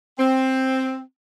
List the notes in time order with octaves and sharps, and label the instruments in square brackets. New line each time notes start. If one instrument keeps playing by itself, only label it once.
[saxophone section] C4